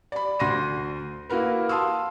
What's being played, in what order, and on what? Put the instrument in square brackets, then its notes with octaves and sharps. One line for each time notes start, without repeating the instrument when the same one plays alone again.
[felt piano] D5 B5
D2 C6 A#6 D#7
A#3 E4 F#4 A#4 B4
F5 A5 C6 D#6 E6